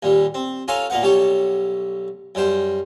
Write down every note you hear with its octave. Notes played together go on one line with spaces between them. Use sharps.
D#2 A#2 G3
C4
F4 A4 C#5 G#5 A#5
A#2 A#3 B3 F#5
B1 G3 G4 A4 C#5
F#2 G3 C5 G5